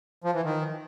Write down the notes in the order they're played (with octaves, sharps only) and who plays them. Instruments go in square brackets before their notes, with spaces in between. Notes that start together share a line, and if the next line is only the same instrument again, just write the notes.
[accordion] F3
E3
D#3